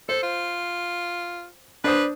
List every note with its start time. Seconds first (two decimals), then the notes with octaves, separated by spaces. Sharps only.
0.09 A4 C5
0.23 F4
1.84 D4 B4 C5 D#6